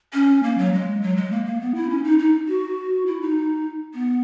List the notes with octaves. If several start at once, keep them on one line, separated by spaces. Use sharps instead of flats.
C#4
A#3
F#3
G#3
F#3
G#3
A#3
A#3
B3
E4
C#4
D#4
D#4
F#4
E4
D#4
B3